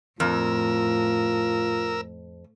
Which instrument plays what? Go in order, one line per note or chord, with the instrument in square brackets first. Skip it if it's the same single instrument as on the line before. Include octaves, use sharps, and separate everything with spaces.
[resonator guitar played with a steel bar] F2 [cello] A2 [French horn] F4 [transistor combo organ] A#4 E6